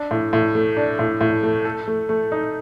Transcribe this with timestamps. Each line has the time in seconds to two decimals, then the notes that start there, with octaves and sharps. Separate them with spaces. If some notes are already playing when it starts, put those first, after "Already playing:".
Already playing: D4
0.11 A2
0.33 A2
0.55 A3
0.77 D4
0.99 A2
1.21 A2
1.43 A3
1.65 A4
1.88 A3
2.09 A3
2.32 D#4